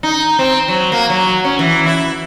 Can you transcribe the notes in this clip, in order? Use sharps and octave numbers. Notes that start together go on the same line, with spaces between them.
D#4
C4
F#3
A#3
F#3
C#4
E3
E4